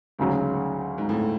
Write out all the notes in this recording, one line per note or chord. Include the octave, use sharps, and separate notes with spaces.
D2 G#2 C#3 F#3
G#2
A2